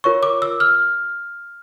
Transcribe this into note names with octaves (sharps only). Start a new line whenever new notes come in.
F4 A#4 C#5 C#6
D6
E6
F6